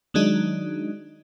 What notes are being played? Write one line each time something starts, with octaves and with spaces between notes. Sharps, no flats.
D#3 F#3 G#3 D4 D#4